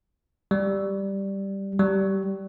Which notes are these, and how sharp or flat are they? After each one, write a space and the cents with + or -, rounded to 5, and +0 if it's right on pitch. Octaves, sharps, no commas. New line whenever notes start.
G3 +0
G3 -20